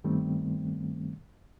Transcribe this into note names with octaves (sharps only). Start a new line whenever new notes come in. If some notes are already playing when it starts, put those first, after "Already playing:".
G2 D#3 G3 A3 B3 C4